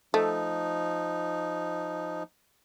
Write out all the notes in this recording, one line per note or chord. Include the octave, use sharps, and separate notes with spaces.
F3 A3 D#4